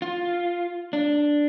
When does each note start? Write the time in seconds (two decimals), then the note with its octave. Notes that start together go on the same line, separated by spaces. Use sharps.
0.02 F4
0.93 D4